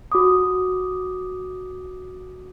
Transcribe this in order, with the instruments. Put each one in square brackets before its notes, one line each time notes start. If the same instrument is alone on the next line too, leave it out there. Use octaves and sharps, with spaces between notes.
[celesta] F#4 D6 D#6